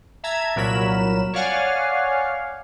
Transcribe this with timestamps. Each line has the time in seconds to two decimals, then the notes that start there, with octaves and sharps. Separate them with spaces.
0.24 E5 A5 A#5 G#6
0.56 C2 A#2 F#3 A#4 B5 E7
1.33 C#5 D5 F5 F#5 G#5